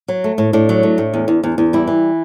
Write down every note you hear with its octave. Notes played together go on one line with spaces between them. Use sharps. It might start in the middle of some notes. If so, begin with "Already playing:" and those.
F#3
A3
A2
A2 D4
F#3
A3
A2
E2
E2
E2
E2
G3 E4
E3